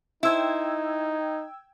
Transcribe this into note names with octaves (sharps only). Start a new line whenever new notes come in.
D#4 E4 C5 G5 E6 G#6